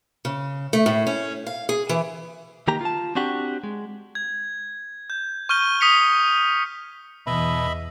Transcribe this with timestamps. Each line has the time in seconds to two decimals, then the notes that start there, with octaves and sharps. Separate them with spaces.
0.25 C#3
0.73 A3
0.86 A2
1.07 C#4
1.47 F5
1.69 G#4
1.89 E3
2.68 D#3 A#3 G4 A#5
2.81 F4 A5
3.15 C4 D4 F#4 G4
3.64 G#3
4.15 G#6
5.10 G6
5.49 C#6 F6 G6 D#7 G7
5.80 D#6 B6 C#7 F7
7.27 E2 B2 D#5 E5 B5